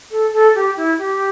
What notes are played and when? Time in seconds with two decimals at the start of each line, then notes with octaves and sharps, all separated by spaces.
0.11 A4
0.33 A4
0.55 G4
0.77 E4
0.98 G4